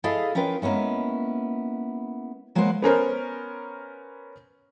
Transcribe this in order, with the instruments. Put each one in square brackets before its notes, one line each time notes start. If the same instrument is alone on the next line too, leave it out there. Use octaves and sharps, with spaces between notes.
[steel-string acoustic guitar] E4 G#4 A4 D#5 F5
C#4 F4 A#4 B4 G5
G#3 A#3 B3 C#4 E4
F#3 G#3 A#3 B3 C5 F#5
[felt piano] B3 C#4 A#4 C5